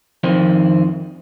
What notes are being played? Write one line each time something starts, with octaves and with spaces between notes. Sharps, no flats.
F2 D#3 F3 C4